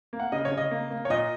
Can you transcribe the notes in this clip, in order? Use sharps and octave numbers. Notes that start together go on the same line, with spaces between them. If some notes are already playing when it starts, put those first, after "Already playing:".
A#3
F#5
C#3 D#5
C#5
C#3
D#5
A#3
A#3
C#5
A#2 D#5